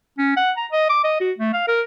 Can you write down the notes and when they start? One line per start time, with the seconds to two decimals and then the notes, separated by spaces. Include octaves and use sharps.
0.18 C#4
0.37 F#5
0.57 A#5
0.72 D#5
0.90 D6
1.04 D#5
1.21 F#4
1.39 A3
1.53 F5
1.68 A#4